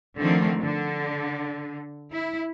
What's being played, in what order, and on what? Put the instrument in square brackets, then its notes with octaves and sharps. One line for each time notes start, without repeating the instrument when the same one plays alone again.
[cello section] D3 D#3 F3 A3 C4
D3
E4